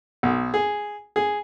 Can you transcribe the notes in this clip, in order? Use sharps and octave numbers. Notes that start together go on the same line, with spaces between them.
B1
G#4
G#4